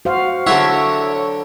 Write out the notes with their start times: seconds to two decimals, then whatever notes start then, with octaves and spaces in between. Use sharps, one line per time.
0.05 F#4 C5 F5
0.46 D3 F#3 E4 C#5 E5 F#5